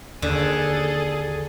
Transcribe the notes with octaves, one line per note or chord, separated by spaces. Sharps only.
D#2 D3 G#4 A4